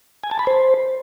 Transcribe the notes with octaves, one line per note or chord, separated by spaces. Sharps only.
G#5
A5
B5
C5